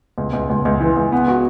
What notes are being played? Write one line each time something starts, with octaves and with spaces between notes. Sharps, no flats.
C#2
C#2
C#2
C#2
E3
C#2
B3
F#4